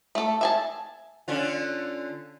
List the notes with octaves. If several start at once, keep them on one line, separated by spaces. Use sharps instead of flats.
A3 A4
E5 G#5 A5
D3 C#4 F4